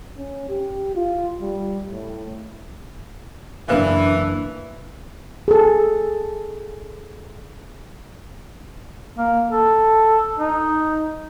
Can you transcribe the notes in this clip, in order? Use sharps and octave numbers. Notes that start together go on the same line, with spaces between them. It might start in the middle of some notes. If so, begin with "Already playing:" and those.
C#4
G4
F4
G3
A2
F#1 E3 D4 A#4 B4 F5
G#4 A4
A#3
A4
D#4